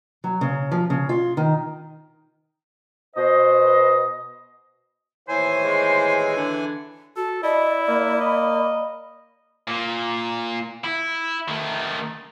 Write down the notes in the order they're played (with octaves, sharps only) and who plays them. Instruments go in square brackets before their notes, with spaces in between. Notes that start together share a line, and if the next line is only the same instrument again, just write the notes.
[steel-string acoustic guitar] F#3
C#3
F3
C#3
F4
D#3
[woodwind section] B2 C5 D#5
[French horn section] D#2 A2 C#5 [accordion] E3 G#5 [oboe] C5
[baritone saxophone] G#3
D3
[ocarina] F#4 [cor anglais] A4
[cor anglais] E4 [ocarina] D5 [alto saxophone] D#5 [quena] B5
[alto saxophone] A#3
[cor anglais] D#5
[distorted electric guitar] A#2
E4
D#3 A3